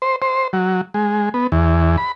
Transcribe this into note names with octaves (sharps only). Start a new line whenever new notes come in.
C5
C5
F#3
G#3
B3
E2
B5